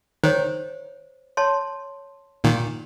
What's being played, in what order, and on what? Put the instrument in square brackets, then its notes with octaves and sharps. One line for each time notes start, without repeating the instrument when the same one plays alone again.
[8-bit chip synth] D#3 [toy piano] C5 C#5
[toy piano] C#5 A5 C6
[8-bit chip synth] A#2 D#3